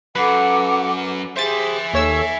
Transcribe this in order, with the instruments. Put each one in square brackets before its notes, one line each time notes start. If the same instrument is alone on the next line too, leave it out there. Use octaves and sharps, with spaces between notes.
[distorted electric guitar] F#2 [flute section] A4 F#5 D6 [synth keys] B4
[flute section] G4 G#4 [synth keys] C5 A6 [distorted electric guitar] E5 G#5
[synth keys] D#2 C#5 E6 [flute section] A4